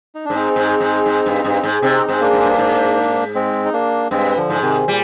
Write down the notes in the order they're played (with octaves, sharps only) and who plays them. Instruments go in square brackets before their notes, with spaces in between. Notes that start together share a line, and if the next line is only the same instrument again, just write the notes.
[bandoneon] D#4
[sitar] G#2 [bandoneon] D4
[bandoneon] C4 D#4
[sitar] G#2
G#2
G#2
G2
G2
G#2
[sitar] C3 [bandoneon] C4 D#4
[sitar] G#2 [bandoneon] C4
[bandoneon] A#3 D4
[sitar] G#2
G2
G#2
[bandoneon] G#3 C4
D#4
A#3 D4
[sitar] G2 [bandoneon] G#3 C4
[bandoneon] D3 F3
[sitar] G#2
[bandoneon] C3 D#3
[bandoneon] A#2 [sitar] G3